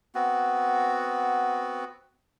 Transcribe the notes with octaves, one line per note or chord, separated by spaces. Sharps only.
B3 C4 F#4